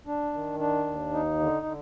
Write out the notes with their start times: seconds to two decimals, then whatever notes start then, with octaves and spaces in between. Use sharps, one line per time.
0.07 D4
0.34 D#3
0.60 D4
0.86 D#2
1.13 D#4
1.40 D3
1.66 D3